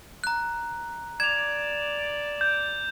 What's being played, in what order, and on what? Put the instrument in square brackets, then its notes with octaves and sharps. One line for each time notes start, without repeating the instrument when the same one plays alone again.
[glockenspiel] A#5 F#6
[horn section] D5 [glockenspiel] G#6 [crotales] E7 F7
[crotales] G6